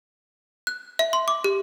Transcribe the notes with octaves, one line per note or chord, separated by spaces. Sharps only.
F#6
E5
C6
D6
G4